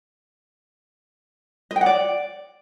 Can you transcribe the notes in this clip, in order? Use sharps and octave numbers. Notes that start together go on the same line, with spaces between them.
D#5
G5
F#5
D5